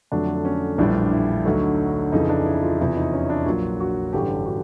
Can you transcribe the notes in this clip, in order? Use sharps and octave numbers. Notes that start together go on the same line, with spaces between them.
F2 D3 F#3 A3 D4
C#4
A#1 A2 E3 G3 D4
E4
D2 D3 F#3 D#4
F2 C#3 E3 D#4
D4
E4
F4
E2 C3 F3 E4
D#4
C#4
D4
A#1 A#2 F#3 F4
F#4
A1 G2 D3 G4
F#4